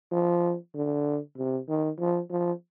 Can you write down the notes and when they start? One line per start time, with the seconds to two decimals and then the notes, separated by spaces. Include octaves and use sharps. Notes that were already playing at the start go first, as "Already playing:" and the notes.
0.12 F3
0.75 D3
1.37 C3
1.68 D#3
1.99 F3
2.30 F3